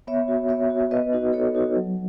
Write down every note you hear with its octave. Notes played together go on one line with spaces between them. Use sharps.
B3 C#5 E5
F#4
B3 C#5 E5
F#4
B3 B4 D#5
D#4 F#4
B3 A4 C#5
D#4 F#4
F#3